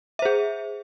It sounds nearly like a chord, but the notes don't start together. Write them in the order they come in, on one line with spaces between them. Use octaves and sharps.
E5 C5 G#4